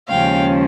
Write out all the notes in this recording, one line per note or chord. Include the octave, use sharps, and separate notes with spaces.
D#2 C#3 F3 G#3 C#4 F5 G5